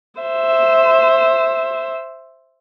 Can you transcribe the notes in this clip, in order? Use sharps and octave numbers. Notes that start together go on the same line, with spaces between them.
C5 E5